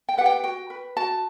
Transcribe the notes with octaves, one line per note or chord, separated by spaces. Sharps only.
G5
G4 B4 F#5
G5
F#4 G5
B4
F#4 A5